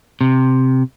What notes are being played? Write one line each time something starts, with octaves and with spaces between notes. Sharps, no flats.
C3